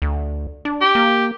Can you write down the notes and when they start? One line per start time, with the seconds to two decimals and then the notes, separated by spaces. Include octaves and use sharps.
0.02 D2
0.65 D4
0.81 G4
0.95 A#3